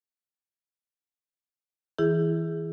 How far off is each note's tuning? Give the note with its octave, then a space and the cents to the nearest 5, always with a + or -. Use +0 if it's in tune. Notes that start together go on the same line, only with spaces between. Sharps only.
E3 -25 E4 +20 G#4 +0